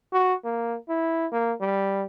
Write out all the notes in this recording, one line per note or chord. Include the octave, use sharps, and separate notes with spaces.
F#4
A#3
E4
A#3
G3